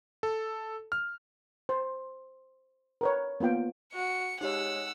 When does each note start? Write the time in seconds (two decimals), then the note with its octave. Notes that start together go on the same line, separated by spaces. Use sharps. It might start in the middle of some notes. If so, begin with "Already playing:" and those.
0.23 A4
0.92 F6
1.69 C5
3.01 A#4 B4 C#5
3.40 A#3 B3 F4 G5
3.94 F#4 C#7
4.41 G#3 D#4 G4 C#5 F#5 E6